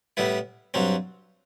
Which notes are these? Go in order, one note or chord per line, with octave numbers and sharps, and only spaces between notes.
A2 G3 B3 E4
G2 F#3 C4